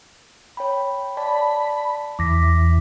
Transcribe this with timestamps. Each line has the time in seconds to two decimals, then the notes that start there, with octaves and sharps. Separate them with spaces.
0.57 C#5 G5 B5
1.17 D5 A5 B5
2.19 E2 E3 D6 A#6 B6